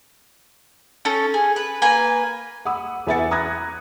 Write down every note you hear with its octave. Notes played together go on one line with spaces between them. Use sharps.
C#4 A4
G#4
B4
A#3 B4 G#5
F#5 B5 D#6 E6
E2 B4 E5 F#5 A6 C#7
A#5 B5 D#6 F#6 G#6 A#6